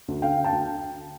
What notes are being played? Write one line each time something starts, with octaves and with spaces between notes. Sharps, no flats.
D2
D3 F5 G5
D3
G5 A5
D2